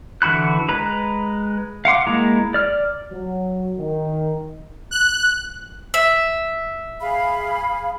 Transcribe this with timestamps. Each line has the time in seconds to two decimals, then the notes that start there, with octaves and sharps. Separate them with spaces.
0.22 D3 E3 F#4 B5 F#6
0.69 G#3 B4 A#5 B5
1.85 F5 F#5 C6 D6
2.07 G#3 A#3 E4 A#5
2.54 D5 F6
3.11 F#3
3.78 D#3
4.91 F#6
5.94 E5
7.01 G#4 F5 B5